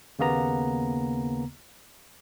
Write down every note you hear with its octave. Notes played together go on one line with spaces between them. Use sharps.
D#2 C#3 A#3 B3 A#5